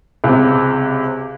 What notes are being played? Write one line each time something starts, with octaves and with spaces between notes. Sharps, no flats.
C#2 C3